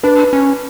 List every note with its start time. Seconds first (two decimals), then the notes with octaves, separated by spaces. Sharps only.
0.03 D4 B4
0.33 C#4